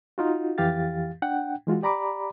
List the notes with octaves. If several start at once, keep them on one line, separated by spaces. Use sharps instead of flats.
D#4 F4 F#4
F2 E3 G4 F5 A6
D4 F#5 G5
E3 G#3 F4 F#4
G4 D5 A#5 B5 D6